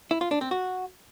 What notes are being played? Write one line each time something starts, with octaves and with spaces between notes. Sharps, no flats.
E4
F4
D4
C4
F#4